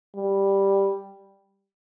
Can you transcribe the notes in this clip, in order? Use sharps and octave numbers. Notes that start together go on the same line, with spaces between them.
G3